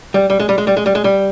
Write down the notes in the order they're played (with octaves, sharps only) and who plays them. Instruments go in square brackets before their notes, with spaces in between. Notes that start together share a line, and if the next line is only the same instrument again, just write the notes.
[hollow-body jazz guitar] G3
G3
G#3
G3
G#3
G3
G#3
G3
G#3
G3